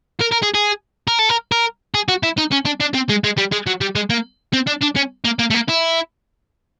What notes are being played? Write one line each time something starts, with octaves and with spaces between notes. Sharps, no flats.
A#4
A#4
G#4
G#4
A#4
A4
A#4
A#4
G#4
F#4
E4
D#4
C#4
D4
D4
C4
G#3
G#3
G3
G#3
F#3
G3
G#3
A#3
C4
D4
D4
C#4
A#3
A#3
A3
A#3
E4